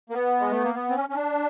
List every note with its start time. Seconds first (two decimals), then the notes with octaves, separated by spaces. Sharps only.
0.10 A#3
0.14 B3
0.40 G#3
0.51 A3
0.64 A#3
0.75 B3
0.89 C4
0.95 C#4
1.09 C#4
1.15 D4